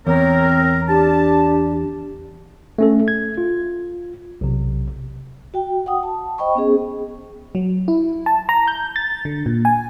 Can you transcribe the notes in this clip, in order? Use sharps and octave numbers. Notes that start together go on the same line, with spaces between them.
E2 C4 A#4 C#5
D4 G4 A5
A3 C#4 A4
G#6
F4
B1 C3
F#4 G5
F#5 G5 D#6
A5
C5 D#5 G5 B5 C#6
B3 C#4 G#4
F#3
E4
A5
A#5
G6
A6
D3
A#2
G#5